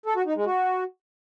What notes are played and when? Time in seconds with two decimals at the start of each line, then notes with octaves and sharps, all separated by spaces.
0.06 A4
0.16 F#4
0.26 D#4
0.36 G#3
0.46 F#4